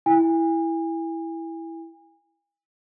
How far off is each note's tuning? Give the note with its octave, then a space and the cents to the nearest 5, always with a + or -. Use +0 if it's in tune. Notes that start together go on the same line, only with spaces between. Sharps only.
E4 +0 G#5 -35